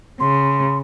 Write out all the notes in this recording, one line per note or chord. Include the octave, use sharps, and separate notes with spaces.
C#3 C6